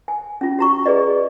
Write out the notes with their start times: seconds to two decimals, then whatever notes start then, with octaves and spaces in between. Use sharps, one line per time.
0.08 G#5
0.41 C#4 F4
0.59 F#4 A#5 C#6
0.86 G#4 B4 D5 D#5